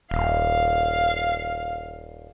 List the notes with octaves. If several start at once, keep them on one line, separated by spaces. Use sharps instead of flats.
D#1 F5